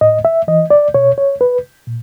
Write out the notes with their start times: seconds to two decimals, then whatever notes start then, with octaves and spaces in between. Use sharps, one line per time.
0.01 A2 D#5
0.25 E5
0.48 E3 D#5
0.70 D5
0.94 B2 C#5
1.18 C#5
1.41 B4
1.87 A#2